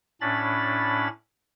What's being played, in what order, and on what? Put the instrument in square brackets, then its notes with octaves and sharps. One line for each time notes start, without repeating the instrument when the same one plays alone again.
[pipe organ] A2 C#4 D4 B5 A6